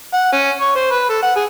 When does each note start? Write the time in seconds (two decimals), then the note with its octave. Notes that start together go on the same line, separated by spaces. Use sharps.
0.14 F#5
0.33 C#4
0.61 C#5
0.76 C5
0.91 B4
1.09 A4
1.23 F#5
1.36 G#4